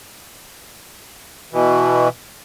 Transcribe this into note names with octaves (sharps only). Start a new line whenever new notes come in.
B2 E3